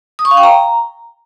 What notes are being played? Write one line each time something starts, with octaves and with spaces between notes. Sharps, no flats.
D#6
C#6
F5
G5
A#5